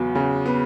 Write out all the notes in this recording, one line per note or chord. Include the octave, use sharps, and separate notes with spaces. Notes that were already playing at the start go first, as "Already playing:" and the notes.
Already playing: E2 C#3 F#3 B3
C#3
B3